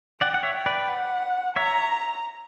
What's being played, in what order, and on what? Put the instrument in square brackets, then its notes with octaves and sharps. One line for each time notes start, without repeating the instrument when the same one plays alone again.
[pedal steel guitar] D5 F#5 [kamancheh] G5
[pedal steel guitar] F#5
C#5 E5
[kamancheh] G5
[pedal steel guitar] B4 D5
[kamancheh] F#5
[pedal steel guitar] C#5 E5 [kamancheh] A#5